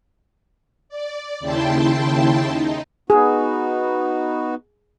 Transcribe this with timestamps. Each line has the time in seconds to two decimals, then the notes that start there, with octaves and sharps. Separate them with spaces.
0.89 D5
1.40 D#2 C#3 E4 G5 A5 C6
2.49 D#4
3.10 B3 D#4 F#4 G#4